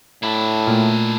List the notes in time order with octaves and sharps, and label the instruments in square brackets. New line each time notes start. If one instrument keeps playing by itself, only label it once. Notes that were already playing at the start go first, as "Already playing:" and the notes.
[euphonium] A2 [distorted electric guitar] D4 E4 [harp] A5 B5
[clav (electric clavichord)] A#2 [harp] A3 F6